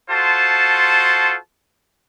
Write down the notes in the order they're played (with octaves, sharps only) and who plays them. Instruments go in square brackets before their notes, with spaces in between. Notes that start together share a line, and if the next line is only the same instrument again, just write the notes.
[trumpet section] F4 F#4 A4 C5 A5